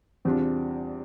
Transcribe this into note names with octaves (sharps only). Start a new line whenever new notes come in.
E2 C3 G3 C4 D4 F4